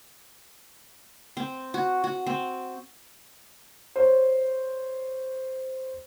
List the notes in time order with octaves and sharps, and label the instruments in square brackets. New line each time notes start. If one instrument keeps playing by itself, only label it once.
[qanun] C4
F#4
F#4
C4
[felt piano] C5 C#5